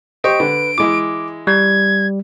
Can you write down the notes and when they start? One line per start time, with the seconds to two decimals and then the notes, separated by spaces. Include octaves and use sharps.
0.24 G4 C5 D#5 C#6 D7
0.40 D3 B4
0.78 E3 G#3 E4 D6
1.47 G3 G#6